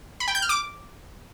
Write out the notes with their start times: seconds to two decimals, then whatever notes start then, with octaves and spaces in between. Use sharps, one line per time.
0.20 B5
0.28 G5
0.35 G6
0.42 F6
0.49 D6